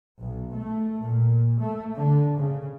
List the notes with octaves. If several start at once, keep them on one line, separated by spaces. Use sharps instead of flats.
B1
A3
A#2
A3
D3
C#3